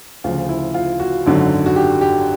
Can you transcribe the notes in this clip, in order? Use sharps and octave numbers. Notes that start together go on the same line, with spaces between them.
D2 C#3 F3 F4
E4
F4
F#4
G#1 F#2 D3 F#3
F#4
G4
G4